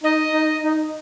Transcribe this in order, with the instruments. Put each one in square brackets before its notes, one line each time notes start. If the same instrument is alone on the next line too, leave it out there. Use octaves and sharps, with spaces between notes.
[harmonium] D#4 [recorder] D#5
[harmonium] D#4
D#4